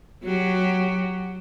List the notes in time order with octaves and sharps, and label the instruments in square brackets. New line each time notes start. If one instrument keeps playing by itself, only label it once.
[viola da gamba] F#3 F#4 G4